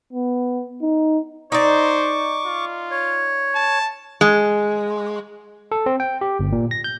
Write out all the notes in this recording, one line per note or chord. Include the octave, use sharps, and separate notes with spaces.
B3
D#4
D#4 C5 D5 C#6 D6
F4
C#5
A5
G#3
A4
C4
G5
G4
G1
A#2
A#6
G6